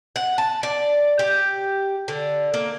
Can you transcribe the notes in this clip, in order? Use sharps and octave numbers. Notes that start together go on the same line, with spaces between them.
F#5
A5
D5
G4
D3
A#3